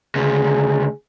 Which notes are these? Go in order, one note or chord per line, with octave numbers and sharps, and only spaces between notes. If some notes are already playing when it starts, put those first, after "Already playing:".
D2 C#3 G#4